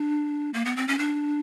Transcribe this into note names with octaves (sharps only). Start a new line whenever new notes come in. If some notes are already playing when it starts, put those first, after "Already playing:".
Already playing: D4
A#3
B3
C4
C#4
D4